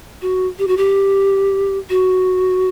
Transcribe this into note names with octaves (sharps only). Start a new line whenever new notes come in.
F#4
G4
F#4
G4
F#4